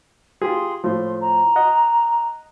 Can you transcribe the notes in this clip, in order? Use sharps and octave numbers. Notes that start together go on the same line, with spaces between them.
F4 G4 G#4 C6
A2 F3 C6
A#5
D#5 F#5